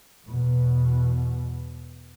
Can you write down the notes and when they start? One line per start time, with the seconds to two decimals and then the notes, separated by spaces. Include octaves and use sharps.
0.24 E2 B2